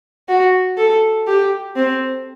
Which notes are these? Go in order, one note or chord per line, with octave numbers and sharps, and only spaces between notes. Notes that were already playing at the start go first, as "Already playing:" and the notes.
F#4
A4
G4
C4